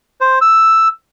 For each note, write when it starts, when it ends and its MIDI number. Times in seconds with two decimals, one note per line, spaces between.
0.21 0.39 72
0.41 0.88 88